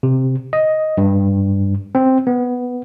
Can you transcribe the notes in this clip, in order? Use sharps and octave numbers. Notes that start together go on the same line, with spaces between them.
C3
D#5
G2
C4
B3